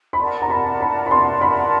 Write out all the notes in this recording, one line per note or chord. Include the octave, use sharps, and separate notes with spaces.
B5
A#4 D5 F#5 A5 C6
A#5
B5
B5
B5
C6
B5